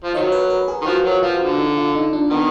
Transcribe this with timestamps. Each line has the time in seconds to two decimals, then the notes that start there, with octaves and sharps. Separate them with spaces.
0.04 F3
0.14 D#3 F#3 D#5
0.32 B4
0.50 A#4
0.68 G#4
0.82 D#3
0.86 F3 F#4
1.05 F#3
1.22 F3 F4
1.41 D3
1.58 D#4
1.77 F4
1.95 D#4
2.13 D4
2.31 D#3 B3